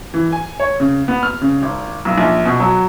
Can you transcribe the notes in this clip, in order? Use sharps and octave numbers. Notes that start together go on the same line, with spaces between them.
E3
G#5
C#5
C#3
B3
F6
C#3
G#1
B1
A#1
B2
F#3